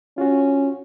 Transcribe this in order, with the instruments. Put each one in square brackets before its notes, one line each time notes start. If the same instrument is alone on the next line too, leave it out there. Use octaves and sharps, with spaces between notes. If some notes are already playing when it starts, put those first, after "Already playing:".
[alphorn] C#4 [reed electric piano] F4 F#4